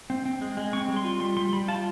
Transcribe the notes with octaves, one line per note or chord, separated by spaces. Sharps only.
C4
C4
G#3
G#3
C4 C#6
G3
C6
F4
G3 C6
G3 C6
G3 B5
F4 A5